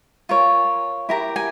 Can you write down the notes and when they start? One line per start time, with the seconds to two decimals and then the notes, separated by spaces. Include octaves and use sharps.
0.29 F4 A#4 C#5
1.09 E4 G4 A#4 A#5
1.36 G#5